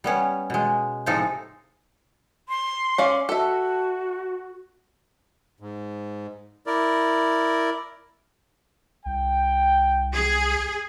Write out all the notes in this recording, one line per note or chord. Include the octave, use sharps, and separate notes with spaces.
G3 B3 C#4
B2 G#3
A2 C3 F3 G#3 D#4 A4
C6
C#4 D5 F5
F#4 A4 E5
G#2
E4 A#4 D5
C2 G5
G#4